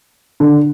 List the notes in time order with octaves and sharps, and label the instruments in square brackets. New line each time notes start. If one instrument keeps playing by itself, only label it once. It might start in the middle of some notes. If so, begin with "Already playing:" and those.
[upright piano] D3